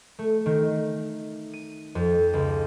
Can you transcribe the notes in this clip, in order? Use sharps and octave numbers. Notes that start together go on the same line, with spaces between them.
A3
D#3
D#7
F2
C#2